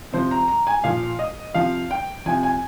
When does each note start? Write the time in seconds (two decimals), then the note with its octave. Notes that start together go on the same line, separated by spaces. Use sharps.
0.12 C3 F3 C5
0.31 A#5
0.48 A#5
0.67 G#5
0.84 A#2 F3 F5
1.19 D#5
1.54 C3 F3 F5
1.91 G5
2.26 C3 F3 G#5
2.43 G#5